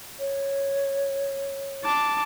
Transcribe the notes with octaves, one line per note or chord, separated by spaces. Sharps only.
C#5
A5 D6